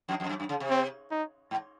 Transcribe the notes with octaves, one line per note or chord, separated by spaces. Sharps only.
F2
F2
F#2
F#2
C#3
C3
C4
D#4
G#2